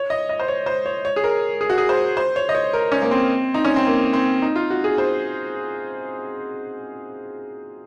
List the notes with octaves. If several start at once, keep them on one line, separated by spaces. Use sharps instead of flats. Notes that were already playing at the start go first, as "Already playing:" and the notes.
Already playing: C#5
D#5
D#5
C5
C#5
C5
C#5
C#5
G#4
A#4
G#4
F#4
G#4
C5
C5
C#5
D#5
C#5
A#4
C#4
A#3
C4
D#4
C#4
C4
A#3
C4
D#4
F4
F#4
G#4
C5